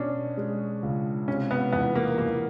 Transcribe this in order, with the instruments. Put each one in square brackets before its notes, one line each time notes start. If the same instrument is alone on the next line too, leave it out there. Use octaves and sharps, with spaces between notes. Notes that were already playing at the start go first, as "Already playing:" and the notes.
Already playing: [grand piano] B2 C#4 [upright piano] D4
[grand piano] G#3
C#2
[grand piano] C3 [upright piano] C#4
[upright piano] B3
[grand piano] E2 [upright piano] B3
[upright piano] A#3
[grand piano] E2 [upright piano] A#3